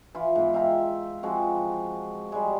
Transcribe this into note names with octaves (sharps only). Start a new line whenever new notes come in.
E3 F4
G#2 B3
F4 E5 G5 A#5
F3 G#3 C4 F#4
G3 G#3